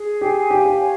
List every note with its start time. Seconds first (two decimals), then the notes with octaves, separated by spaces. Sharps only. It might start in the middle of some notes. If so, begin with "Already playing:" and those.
Already playing: G#4
0.21 G4 G#5
0.50 G4 F5
0.65 G4
0.79 C#5